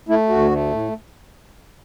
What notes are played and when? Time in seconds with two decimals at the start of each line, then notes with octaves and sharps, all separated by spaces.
0.09 A3 E4
0.29 D2 F#4
0.51 A3
0.71 A2